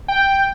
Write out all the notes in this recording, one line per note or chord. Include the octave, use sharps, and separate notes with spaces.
G5